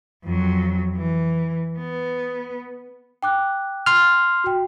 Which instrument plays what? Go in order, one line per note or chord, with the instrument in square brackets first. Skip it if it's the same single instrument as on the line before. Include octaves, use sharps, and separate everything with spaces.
[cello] F2 F#3
E3
B3
[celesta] G5 D6 F#6
[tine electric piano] C6 F6
[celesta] F#4 G5